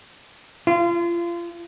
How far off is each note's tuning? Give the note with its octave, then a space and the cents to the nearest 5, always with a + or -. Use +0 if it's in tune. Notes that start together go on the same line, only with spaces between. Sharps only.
F4 -30